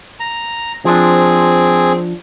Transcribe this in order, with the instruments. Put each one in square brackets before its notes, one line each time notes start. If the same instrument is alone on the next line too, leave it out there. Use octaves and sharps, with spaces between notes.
[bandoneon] A#5
[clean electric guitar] F3 D4 [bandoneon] C4 G#4